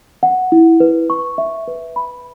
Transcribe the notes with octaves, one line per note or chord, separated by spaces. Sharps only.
F#5
E4
B4
C#6
E5
B4
B5